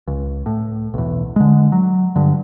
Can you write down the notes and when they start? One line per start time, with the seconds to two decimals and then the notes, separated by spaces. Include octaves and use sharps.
0.07 C#2
0.46 A2
0.94 B1 E2
1.36 D3 G#3
1.72 F#3
2.16 G2 D3